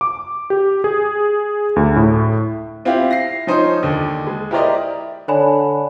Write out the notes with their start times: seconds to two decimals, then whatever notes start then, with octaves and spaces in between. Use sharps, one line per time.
0.01 D6
0.50 G4
0.84 G#4
1.76 D2
1.96 A2
2.85 C4 E4 F4 G4 F5
3.11 A#6 C7
3.47 F3 C#4 D#4 C5
3.83 D#2 D3
4.27 G#3
4.51 E4 G4 A#4 C5 D5 D#5
5.28 D3 C#5 G#5 B5